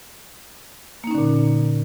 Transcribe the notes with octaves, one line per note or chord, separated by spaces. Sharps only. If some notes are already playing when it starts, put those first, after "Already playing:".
A#2 D3 A#3 C#4 D#4